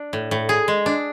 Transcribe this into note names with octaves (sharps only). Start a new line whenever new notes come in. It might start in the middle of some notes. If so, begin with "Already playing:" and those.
Already playing: D4
A2
A2
G#4
G#3
D4